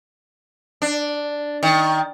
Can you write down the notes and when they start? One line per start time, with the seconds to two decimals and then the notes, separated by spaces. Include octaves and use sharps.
0.82 D4
1.63 D#3